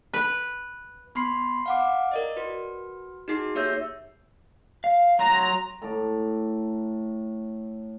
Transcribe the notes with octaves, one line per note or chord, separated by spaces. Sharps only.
B4
B3 B5 C6 C7
F5 F#5 D6
A#4 D5 D#5
F#4 B4
D#4 F#4 G#4 C7
A#3 G4 C#5 E5 E6 G6
F5
F#3 A#5 C6
A2 A5 A#5 D6